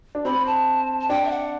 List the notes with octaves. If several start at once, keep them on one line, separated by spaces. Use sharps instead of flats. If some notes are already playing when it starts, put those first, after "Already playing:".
D4
C4 B5
A5
A5
D4 G5
E5
F#5